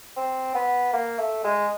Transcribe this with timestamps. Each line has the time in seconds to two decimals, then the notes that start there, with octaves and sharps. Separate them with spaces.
0.16 C4
0.55 B3
0.93 A#3
1.18 A3
1.44 G#3